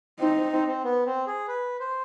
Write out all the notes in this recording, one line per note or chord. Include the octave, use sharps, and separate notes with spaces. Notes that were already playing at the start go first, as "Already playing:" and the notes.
C4 D#4
C4
C4
C4
B3
C4
G#4
B4
C5